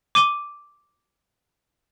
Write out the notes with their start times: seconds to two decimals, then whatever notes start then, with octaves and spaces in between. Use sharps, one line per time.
0.15 D6 D#7 G7